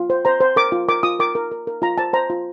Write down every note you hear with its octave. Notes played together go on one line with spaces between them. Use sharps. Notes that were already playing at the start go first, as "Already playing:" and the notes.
Already playing: F4
C5
C5 A#5
C5
A#4 D6
F4
A#4 D6
F4 D#6
A#4 D6
A#4
A#4
A#4
F4 A#5
C5 A5
C5 A#5
F4